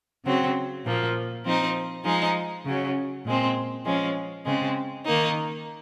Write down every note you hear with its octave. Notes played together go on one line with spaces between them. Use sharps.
C#3 F#3 C4
A#2 F3 A#3
F3 C4 D#4
F3 G#3 D#4
C#3 F#3 C#4
A#2 G#3 C4
F3 G#3 C#4
C#3 G#3 C4
D#3 A#3 D#4